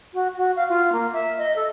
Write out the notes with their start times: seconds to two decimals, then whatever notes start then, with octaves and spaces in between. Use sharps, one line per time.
0.14 F#4
0.37 F#4
0.56 F5
0.69 F4
0.93 A#3
1.13 E5
1.38 D#5
1.56 A4